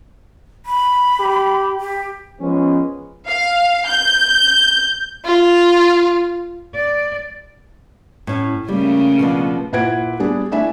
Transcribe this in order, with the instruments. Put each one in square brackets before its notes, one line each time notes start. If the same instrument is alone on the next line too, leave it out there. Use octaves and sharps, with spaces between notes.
[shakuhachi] B5
[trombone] G4
[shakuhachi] G4
[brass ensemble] F3 G#3 B3 C#4
[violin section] F5
G6
[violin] F4
[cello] D5
[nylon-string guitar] A2 C#4
[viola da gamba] C#3 A3 A#3 [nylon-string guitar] G3
[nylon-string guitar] B2 F3 D4
[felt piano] A#2 E4 B4 F#5 G#6 D7
G3 B3 D4 G#4
A3 D4 E4 E5 G#5